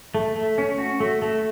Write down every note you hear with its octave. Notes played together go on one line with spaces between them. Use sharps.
A3
A3
C#4
F#4
A3
A3